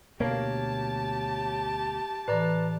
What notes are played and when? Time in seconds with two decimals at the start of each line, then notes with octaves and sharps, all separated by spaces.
0.20 D2 B2 A#3 G4 C#5 F5 A5
2.28 A2 E3 B4 D5 A#5